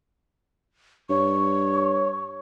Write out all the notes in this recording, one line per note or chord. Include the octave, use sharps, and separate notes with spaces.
G2 C#5 C#6